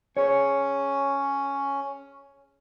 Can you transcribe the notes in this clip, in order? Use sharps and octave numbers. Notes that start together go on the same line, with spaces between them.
C#4 G#4 C#5